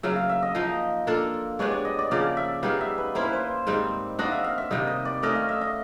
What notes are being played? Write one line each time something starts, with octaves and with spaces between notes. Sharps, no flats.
C#3 F#3 A#3 E5
F5
E5
D#5
F3 A#3 D#4
A#3 D4 F4 A4
G#3 B3 D4 G4 C#5
D5
D#5
D5
C#3 F3 A#3 C#4 D5
E5
G3 B3 D#4 G#4 F5
E5
B4
A#3 C#4 E4 C5
B4
C5
G#2 D#3 G3 C4
A#3 D4 F#4 D#5
E5
F5
E5
C3 D#3 G3 D#5
D#5
D5
A3 C#4 F#4 A#4 D#5
F5
E5
D#5